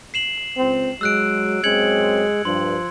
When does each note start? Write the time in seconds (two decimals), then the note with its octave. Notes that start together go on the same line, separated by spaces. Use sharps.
0.14 C7 E7 F#7
0.57 C#2 C4
1.01 F#3 G#3 E6 F#6 D7
1.64 F#2 G#3 C4 C#4 G#6 C#7 F#7
2.45 G2 F3 C6